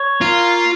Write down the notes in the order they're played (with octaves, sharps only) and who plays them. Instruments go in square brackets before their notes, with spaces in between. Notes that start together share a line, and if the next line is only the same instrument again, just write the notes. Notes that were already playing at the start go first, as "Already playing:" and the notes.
Already playing: [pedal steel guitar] C#5
[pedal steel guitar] A#3 [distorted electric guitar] F4